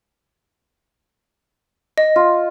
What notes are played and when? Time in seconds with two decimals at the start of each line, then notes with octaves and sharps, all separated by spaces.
1.98 D#5
2.16 F4